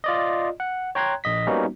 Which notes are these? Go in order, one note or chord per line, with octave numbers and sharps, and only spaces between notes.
F4 D5 D#5
F#5
C#5 G5 A#5 C6 F#6 G#6
A#1 D#5 B6
G3 A#3 B3 C#4 D#4 F#4